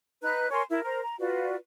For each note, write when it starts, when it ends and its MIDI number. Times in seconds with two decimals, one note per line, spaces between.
0.23 0.50 63
0.23 0.50 71
0.23 0.50 82
0.23 0.50 90
0.51 0.63 70
0.51 0.63 73
0.51 0.63 80
0.51 0.63 84
0.70 0.83 64
0.70 0.83 70
0.84 1.00 70
0.84 1.00 72
0.84 1.00 82
1.03 1.16 82
1.19 1.56 65
1.19 1.56 66
1.19 1.56 71
1.19 1.56 74